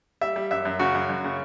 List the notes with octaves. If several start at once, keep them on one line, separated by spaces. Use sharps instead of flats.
G3 E5
G3
F#2 E5
F#2
C#3 F#4
F#2
F#2
C#3